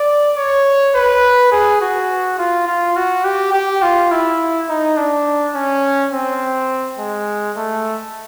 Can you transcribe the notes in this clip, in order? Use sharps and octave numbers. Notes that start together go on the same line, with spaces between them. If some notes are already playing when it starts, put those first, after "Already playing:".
Already playing: D5
C#5
B4
G#4
F#4
F4
F4
F#4
G4
G4
F4
E4
D#4
D4
C#4
C4
G#3
A3